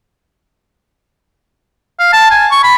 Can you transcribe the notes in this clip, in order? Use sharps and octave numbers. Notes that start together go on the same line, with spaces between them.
F5
A5
G#5
C#6
B5